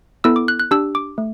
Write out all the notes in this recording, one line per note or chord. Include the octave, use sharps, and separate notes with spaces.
B3 E4 A4 E6
D6
F#6
F#6
D4 G4 E6
D6
A3